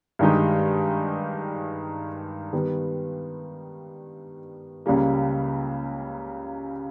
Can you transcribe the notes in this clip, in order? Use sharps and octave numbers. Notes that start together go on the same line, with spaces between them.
G2 D#3 G#3 D#4 G4
D#3 G3 B3
C#2 C#3 G3 A#3